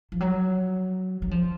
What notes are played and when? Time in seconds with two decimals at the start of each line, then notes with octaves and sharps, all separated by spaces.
0.12 F3
0.20 F#3
1.22 F#3
1.31 F3